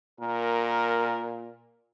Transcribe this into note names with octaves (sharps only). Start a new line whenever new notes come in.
A#2 A#4